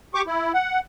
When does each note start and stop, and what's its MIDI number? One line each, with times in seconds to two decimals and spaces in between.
0.14 0.22 67
0.14 0.22 85
0.14 0.22 86
0.27 0.52 64
0.54 0.80 78